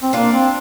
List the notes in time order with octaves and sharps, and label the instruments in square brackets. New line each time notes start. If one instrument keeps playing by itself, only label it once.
[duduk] C4
[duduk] A#3 [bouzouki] D4 F4
[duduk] C4